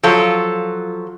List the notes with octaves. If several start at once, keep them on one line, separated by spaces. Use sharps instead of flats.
F3 F#3 F4 A4 C#5